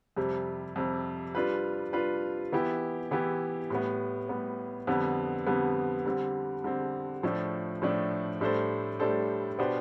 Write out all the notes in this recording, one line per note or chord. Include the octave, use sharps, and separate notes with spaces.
F2 C3 G3
F2 C3 G3
G3 D4 F4 B4
G3 D4 F4 B4
E3 B3 E4 G4
E3 B3 E4 G4
A2 G3 B3
A2 G3 B3
F2 D3 G3 B3
F2 D3 G3 B3
D3 G3 C4
D3 G3 C4
A2 F3 A3 D4
A2 F3 A3 D4
A2 G3 D4 A4 C5
A2 G3 D4 A4 C5
B2 B3 D4 G4 C5